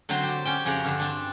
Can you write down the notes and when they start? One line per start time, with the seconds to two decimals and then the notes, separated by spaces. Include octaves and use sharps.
0.09 D3 F#3 C4 C5 A#5
0.23 G4
0.45 C#4 G4 G5
0.65 F2 C#3 G4 C#5 F#5 A#5
0.85 G2 D3
1.00 C4 D4